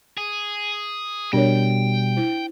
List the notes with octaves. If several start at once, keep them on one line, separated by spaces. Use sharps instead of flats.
G#4
B2 G3 D4 A#4 C#5 G5
E4 C5